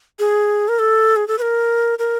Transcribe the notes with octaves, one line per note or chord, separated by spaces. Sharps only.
G#4
A#4
A4
G#4
A4
B4
A#4
A#4